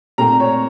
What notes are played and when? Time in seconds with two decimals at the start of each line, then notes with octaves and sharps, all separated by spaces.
0.18 A#2 A3 C4 A#5
0.40 C#5